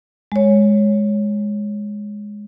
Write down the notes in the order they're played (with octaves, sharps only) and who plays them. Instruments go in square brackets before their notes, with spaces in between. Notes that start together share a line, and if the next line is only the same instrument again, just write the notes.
[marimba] G#3 C#5